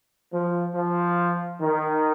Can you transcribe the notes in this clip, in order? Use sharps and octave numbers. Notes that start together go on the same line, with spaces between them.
F3
F3
D#3